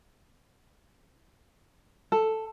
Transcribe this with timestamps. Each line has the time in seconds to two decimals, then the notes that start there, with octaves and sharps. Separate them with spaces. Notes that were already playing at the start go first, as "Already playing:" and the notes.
2.12 A4